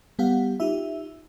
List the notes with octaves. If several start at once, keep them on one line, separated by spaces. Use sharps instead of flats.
G3 B3 G4 F5 F#5
D#4 F4 G4 E5